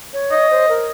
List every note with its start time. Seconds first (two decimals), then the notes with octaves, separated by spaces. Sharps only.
0.13 C#5
0.31 D#5
0.51 C5
0.69 A#4